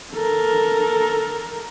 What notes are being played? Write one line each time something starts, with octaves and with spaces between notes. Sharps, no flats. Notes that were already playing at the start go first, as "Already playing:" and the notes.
A4 A#4